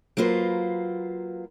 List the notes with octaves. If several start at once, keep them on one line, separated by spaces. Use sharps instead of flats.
F#3 A#3 F4 B4 C5